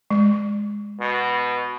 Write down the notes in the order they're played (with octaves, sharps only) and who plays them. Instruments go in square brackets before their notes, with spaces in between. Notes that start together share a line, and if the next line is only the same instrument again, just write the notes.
[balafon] G#3
[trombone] B2